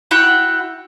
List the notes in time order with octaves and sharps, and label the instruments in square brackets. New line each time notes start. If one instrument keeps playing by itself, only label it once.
[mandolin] E4 F#4 F#5 G5